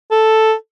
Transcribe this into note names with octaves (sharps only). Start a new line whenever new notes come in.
A4